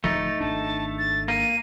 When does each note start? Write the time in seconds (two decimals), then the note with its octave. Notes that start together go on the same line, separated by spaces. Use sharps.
0.04 D1 F3 A3 D#4 A6
0.41 G#1 D4 A5
0.98 A6
1.28 A#3 D#7